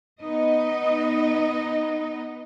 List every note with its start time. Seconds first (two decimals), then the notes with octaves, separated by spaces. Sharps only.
0.21 B3 D#4 D#5